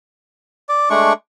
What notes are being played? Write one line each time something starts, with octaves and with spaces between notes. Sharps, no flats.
D5
G#3 A3 D4 C#6